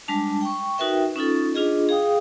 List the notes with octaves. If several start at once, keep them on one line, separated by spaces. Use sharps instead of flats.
G3 G#3 D4 A5
G5 C#6
D#4 F#4 A#4 B4 E5 G5
C#4 D#4 F4 A4
D4 F4 G#4 D#5
G#4 F5 G5 D#6